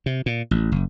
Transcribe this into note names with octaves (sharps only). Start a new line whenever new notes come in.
C3
A#2
A1
F#1